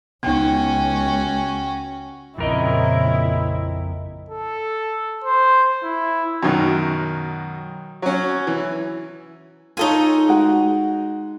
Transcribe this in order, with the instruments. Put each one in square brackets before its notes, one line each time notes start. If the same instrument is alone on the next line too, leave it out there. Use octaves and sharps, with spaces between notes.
[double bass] C#2 [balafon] B3 D#4 [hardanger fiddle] C#4 F#4 [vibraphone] G5
[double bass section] A#1 C#3 C4 [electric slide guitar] F2 A#4 D#5 [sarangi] E4
[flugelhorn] A4
C5
E4
[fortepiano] F#2 B2 D#3 F#3
F#3 C#4
E3
[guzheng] D#4 D#5 G#5 [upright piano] F4 A4 C#5
[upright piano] G#3 F#4